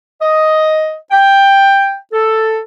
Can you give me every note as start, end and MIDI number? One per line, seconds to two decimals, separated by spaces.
0.22 0.94 75
1.12 1.96 79
2.13 2.60 69